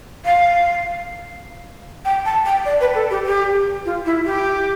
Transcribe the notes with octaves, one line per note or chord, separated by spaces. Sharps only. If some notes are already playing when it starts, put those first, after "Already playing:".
F5
G5
A5
G5
D5
B4
A4
G4
G4
F4
E4
G4